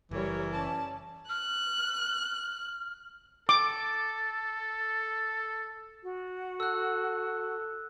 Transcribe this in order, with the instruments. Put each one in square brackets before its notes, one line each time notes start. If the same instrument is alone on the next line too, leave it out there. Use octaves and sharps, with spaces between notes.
[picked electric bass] F#1 [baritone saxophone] E3 [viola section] G3 A#4 C#5
[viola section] C#4 D5 [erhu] A5
[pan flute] F6 [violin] F#6
[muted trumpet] A4 [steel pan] D6
[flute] F#4
[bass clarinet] A4 [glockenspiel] E6 F#6